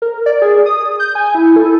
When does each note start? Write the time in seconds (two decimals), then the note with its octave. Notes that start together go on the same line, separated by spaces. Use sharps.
0.02 A#4
0.26 D5
0.42 G#4
0.66 D#6
1.00 G6
1.15 G#5
1.35 E4
1.56 A4